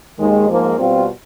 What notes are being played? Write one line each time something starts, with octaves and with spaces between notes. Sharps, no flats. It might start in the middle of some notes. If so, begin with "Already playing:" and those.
D#2 D#3 G#3
G#2 F3 A#3
B2 G3 C4 F4